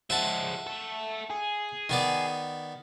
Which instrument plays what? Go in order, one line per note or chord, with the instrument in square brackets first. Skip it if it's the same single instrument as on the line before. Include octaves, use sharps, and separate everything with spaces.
[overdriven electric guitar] F3 G#3 [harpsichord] E5 F#5 A5
[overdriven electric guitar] A3 A4
G#4
[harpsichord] D#3 B3 D5